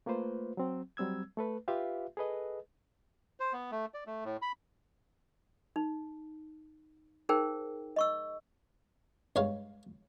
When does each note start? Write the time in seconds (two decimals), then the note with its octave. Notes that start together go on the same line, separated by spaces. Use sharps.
0.06 A3 A#3 F4 B4 C5
0.57 F#3 C4
0.97 F#3 G3 C4 E6 G#6
1.37 A3 A4 B4
1.68 F4 G4 B4 E5 F5
2.17 G#4 A4 B4 D#5
3.40 C5
3.53 B3
3.71 A3
3.94 D5
4.07 A3
4.25 A2
4.42 B5
5.76 D#4
7.29 D#4 G#4 A#4 C5 G5
7.96 D#5 C#6 E6
9.36 G2 G#3 C#5 F5